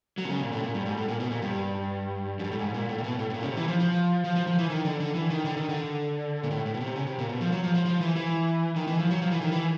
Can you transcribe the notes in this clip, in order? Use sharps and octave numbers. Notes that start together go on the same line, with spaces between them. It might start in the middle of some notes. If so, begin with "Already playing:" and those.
F#3
C3
C#3
A#2
A2
A#2
G2
G#2
A2
A#2
B2
A#2
G2
F#2
G2
A2
G#2
A#2
A2
A#2
B2
A2
A2
A#2
C#3
C3
E3
F3
F3
F3
F3
F3
E3
D#3
D3
D3
E3
D#3
D3
D#3
D3
A#2
A2
A2
B2
C3
C#3
C3
A#2
B2
F3
F#3
F3
F3
F3
E3
E3
D#3
E3
F3
F#3
F3
E3
D#3
E3